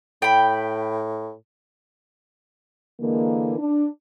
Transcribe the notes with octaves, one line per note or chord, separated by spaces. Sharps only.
A2 G5 B5
D3 E3 G#3 A#3
D4